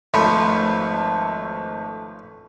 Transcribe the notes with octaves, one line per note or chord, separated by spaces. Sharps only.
G#1 F3 A3 C#4 B4